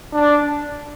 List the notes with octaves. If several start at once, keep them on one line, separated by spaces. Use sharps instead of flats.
D4